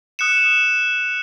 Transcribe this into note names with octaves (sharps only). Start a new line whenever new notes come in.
D#6 F#6 C#7 E7